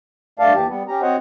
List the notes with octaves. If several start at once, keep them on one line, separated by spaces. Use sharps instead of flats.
G2 A3 D5 F5 A5
D#2 E3 G4 A5
G3 B3
C#4 G4 A#5
C4 F#4 C5 C#5 D#5 F#5